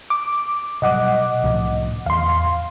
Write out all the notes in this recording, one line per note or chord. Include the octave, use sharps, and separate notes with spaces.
D6
B2 F#3 G3 D#5 F#5 D6
C2 A2 F3
E2 E3 F5 C6